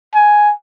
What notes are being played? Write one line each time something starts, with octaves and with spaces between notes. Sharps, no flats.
G#5